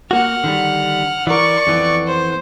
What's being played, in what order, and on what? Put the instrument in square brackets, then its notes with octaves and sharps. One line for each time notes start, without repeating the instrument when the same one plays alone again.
[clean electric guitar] A#3 F#4 [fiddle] F#5 F6
[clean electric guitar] D3 D#3 G3
[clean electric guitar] E3 A#4 [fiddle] D5 C#6
[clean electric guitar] F2 E3 B3
[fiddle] C5